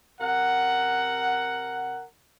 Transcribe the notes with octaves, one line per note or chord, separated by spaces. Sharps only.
C3 A#4 F#5